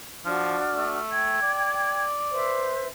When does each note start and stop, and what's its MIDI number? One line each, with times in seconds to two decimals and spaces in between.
0.25 0.60 53
0.25 0.99 62
0.25 0.99 66
0.25 0.99 89
0.76 1.40 57
1.12 2.03 79
1.12 2.03 92
1.42 2.77 74
2.32 2.86 71
2.32 2.86 72
2.32 2.86 76